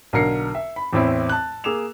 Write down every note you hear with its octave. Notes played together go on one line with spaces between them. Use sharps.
B1 D3 A#4 C7 C#7
E5
B5
E2 A2 C4 E4
A5 F#6
A#3 G#4 D6 E6 E7 F7